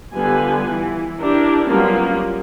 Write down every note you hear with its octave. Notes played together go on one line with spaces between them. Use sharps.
D3 G3 B3 F4 B4 G#5
E3
D4 E4 G4 A#4
F#3 G3 A#3 B3 C#4 F4